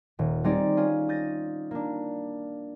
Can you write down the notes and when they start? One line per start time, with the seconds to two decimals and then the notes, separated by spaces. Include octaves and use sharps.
0.19 D#1
0.44 G3 C4 D#4 G#4 D5
0.77 C#4 F4 G#4
1.09 D#6 G6 A6 A#6 D#7
1.71 A#3 D4